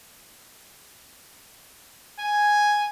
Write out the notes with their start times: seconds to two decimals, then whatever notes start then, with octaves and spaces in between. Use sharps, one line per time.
2.20 G#5